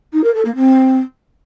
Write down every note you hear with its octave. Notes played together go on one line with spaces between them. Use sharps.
D#4
A#4
A4
A#3
C4